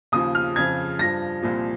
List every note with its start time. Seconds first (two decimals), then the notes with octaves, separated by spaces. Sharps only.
0.12 D#2 C#3 F3 D#6
0.35 F6
0.56 F2 C#3 F3 G#6
0.99 G2 F3 A#6
1.42 C2 A#2 F3